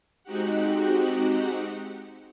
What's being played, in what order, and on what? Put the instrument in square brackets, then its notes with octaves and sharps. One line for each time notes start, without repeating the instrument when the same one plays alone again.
[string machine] G#3 C4 D#4 F#4 G4 F#5